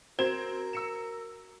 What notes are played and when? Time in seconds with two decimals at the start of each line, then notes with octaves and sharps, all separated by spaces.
0.19 C4 F#4 A#4 C5 G#6 E7
0.73 E6 C#7 E7